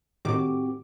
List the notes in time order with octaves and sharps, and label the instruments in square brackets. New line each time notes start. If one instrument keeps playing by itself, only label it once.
[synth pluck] A2 D#3 D6 [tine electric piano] C4 F#4 G4